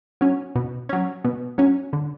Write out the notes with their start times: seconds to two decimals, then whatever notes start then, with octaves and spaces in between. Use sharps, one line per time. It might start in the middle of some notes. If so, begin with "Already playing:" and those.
0.21 F#3 C#4
0.55 B2
0.89 F#3 C#4
1.24 B2
1.58 F#3 C#4
1.93 D3